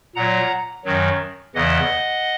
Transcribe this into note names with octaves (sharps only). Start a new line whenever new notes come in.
A#2 F#3 F#5 A#5
F#2 D#3 F#3
E2 C#3 E3 D#5 F#5